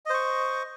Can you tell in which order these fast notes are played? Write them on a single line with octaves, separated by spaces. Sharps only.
D#5 C5 C#6